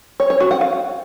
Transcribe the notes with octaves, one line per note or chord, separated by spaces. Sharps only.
C#5
C#5
F#4
F#5
F5